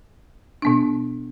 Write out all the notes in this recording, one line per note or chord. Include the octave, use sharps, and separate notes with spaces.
B2 B3 D4